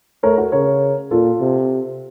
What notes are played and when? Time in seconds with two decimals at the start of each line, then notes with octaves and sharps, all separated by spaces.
0.23 A3 A#4 C#5
0.38 F#4 A#4
0.52 C#3 A#4 C#5
1.11 A#2 F4 A4
1.40 C3